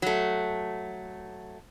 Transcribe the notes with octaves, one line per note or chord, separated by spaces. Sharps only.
F#3 A3